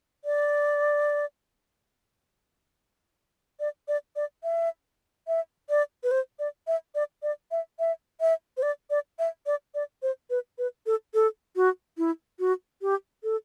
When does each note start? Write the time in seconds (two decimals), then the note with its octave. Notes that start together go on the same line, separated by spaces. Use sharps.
0.25 D5
3.60 D5
3.88 D5
4.16 D5
4.44 E5
5.28 E5
5.70 D5
6.04 B4
6.11 C5
6.39 D5
6.67 E5
6.95 D5
7.23 D5
7.51 E5
7.79 E5
8.21 E5
8.57 C5
8.62 D5
8.90 D5
9.19 E5
9.46 D5
9.75 D5
10.02 C5
10.30 B4
10.58 B4
10.86 A4
11.14 A4
11.56 F#4
11.98 E4
12.40 F#4
12.82 G4
13.23 A4